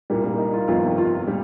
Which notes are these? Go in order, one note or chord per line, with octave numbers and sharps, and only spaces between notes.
C2 A#2 G3 A#3
A#3
D#4
F4
G1 F2 C3 D#3 F4
F4
A#2 G3